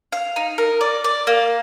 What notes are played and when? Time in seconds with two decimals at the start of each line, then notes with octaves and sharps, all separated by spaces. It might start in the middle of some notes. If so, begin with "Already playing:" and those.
0.12 F5
0.36 D#4
0.58 A#4
0.81 D5
1.04 D5
1.27 A#3